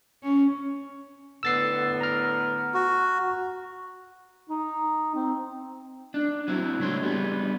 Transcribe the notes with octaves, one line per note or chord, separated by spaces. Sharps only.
C#4
A2 D3 B3 E6 A6 C7
A#5 F6
F#4
D#4
C4
D4
F#3 C4 E4
C#2 A2 A3 D4 C#5 C6
G3 B3 G#4